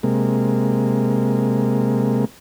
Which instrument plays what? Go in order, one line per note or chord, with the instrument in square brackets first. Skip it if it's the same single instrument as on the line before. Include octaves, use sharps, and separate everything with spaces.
[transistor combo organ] C3 G#3 A#3